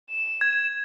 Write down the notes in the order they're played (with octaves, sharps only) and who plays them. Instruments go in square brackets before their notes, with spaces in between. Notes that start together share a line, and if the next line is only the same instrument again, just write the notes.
[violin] E7
[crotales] G#6